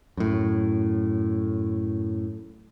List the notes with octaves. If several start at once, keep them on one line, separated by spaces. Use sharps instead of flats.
F#2 A2